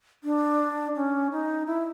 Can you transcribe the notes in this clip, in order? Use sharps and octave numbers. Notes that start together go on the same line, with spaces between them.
D4
C#4
D#4
E4